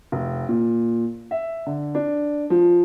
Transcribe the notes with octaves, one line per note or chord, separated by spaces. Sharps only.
F1
A#2
E5
D3
D4
F3